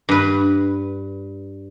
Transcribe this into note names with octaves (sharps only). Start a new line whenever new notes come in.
G2 B4